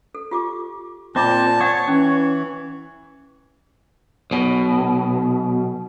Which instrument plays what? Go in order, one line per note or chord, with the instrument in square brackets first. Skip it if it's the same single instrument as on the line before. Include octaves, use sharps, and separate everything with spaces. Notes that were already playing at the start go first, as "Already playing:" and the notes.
[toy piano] A4
F4 G4 D6
[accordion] A#2 A5 [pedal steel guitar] C4 [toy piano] F4 D#5 D6
[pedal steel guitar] C#5 [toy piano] F#5 D#6
[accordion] E3 [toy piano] C#4
[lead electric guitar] B1 B2